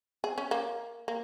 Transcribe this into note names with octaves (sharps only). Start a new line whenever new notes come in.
G#4
C#4
A#3
A#3